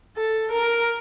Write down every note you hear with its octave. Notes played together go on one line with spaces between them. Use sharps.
A4
A#4